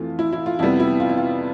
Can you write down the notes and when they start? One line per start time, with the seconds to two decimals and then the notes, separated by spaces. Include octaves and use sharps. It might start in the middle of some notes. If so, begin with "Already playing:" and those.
Already playing: F2 E3 A3 F4
0.19 E4
0.33 E4
0.46 F4
0.59 F2 C3 G3 B3 E4
0.80 E4
1.00 F4
1.10 E4
1.18 F4